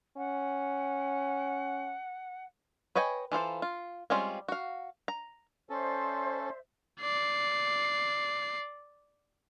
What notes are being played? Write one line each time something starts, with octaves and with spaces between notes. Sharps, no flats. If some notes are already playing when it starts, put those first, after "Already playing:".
C#4 F#5
B4 C#5 D#5 G5 G#5
E3 F4 A4 C5
F4
G3 G#3 C4 C#4 F4
F#4 F5
A#5
C#4 A4 C5 D5 E5
D5 C7